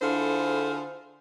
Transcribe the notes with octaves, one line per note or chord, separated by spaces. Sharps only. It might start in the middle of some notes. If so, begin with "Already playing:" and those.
D3 E4 F4 G#4 A4 C5